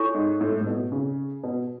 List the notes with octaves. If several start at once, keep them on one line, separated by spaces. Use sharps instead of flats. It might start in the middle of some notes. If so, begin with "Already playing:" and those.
Already playing: E4 A4 C#5 G#5 C#6
G#2
A2
A2
B2
C#3
B2